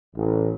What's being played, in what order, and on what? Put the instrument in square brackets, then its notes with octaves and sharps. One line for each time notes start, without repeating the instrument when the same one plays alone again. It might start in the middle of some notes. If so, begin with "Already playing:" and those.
[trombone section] A1